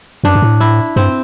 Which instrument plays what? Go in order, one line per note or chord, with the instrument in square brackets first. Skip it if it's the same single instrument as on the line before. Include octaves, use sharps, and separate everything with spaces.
[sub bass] F#2 [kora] D4
[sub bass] G2
A2
[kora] E4
[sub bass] G2 [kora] C4